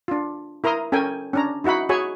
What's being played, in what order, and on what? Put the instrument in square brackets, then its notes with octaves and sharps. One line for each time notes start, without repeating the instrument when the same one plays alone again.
[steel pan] D4 F4
E4 A#4 A#5 C6 D#6
C#4 A4 A#4 G5 G#5
C#4 D4 A#5
D#4 E4 F#4 F#5 B5
F#4 G#4 C#5 G#5 B5 C#6